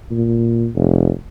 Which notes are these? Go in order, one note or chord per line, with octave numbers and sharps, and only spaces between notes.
A#2
F1